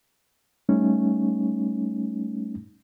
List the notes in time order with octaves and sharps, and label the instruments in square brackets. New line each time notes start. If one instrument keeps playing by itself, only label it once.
[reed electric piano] G3 A3 C#4 D#4